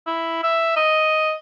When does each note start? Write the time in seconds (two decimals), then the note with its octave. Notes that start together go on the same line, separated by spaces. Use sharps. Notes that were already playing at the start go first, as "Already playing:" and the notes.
0.06 E4
0.43 E5
0.76 D#5